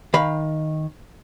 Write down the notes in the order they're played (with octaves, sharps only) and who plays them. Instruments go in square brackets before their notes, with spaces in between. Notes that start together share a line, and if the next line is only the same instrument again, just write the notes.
[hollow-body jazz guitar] D#3 F5 B5